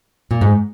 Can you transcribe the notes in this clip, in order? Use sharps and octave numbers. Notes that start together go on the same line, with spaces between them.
A#2
G#2